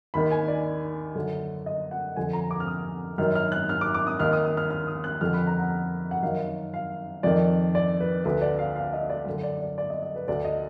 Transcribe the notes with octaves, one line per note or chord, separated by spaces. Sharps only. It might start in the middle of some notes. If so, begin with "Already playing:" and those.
D#2 D#3 B5
G#5
D5
F#2 D3
D#5
F#5
F2 D3 G#5
A#5
D6
F6
D#6
F#2 D#3 F6
F6
F#6
F6
D6
D6
D#6
D#2 D#3 F6
D#6
D#6
F6
F6
D#6
F#6
F2 D3 F6
B5
A#5
F#5
F#5
F#2 D#3 F5
F5
F2 D#3 D5
D5
B4
D2 D3 B4
D5
F5
F5
D#5
D5
F#2 D3
D5
D5
D5
D#5
D#5
B4
D2 D3 D5
D#5